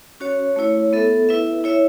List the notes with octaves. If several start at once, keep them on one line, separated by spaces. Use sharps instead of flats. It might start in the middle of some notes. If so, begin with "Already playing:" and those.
C#4 F#4 C#5
A3 E4 C#5
B3 A4 E5
E4 B4 E5
E4 C#5 E5